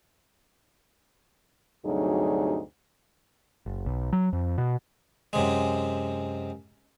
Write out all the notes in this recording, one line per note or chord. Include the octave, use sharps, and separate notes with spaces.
D2 G2 C3 F#3 D#4 G#4
F#1
B1
F#3
F2
B2
F#2 C3 G#3